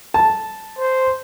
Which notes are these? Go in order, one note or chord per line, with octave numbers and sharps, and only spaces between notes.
A5
C5